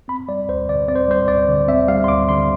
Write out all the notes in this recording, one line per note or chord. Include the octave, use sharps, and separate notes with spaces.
C4 B5
G3 D5
D2 C5
D3 D5
C4 D5
C5
G3 C5
D2 D5
D3
C4 E5
G3 F5
C6
D2 D6
D3 C6